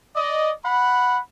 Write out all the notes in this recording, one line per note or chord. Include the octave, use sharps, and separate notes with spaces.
D5 D#5
F#5 B5